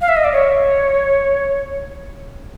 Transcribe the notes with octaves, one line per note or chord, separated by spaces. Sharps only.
F5
E5
D#5
D5
C#5